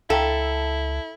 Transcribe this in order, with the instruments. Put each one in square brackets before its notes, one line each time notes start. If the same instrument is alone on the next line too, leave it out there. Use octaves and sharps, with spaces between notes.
[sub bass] C#2 [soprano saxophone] E4 [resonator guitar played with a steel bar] A4 [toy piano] F5 G5 A#5